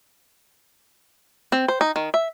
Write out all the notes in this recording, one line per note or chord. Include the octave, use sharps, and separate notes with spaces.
C4
C5
D#4
D#3
E5